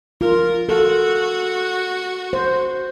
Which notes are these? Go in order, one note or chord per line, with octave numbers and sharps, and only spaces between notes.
F4 A#4
F#4 A4
C5